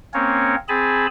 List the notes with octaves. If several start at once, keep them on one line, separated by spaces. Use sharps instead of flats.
A#3 C4 C#4 A#4 C#5
C4 G#4 G#5 A5 B5